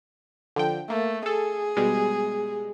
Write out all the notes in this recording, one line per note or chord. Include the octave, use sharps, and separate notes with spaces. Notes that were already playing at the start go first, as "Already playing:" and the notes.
D3 F3 G5
A3 A#3
G#4 A4
B2 G3 G#3